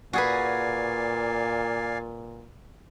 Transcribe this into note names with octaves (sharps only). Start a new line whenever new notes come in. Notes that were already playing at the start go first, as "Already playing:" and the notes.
A#2 F#4 G#4 B4 D5 F5 G#5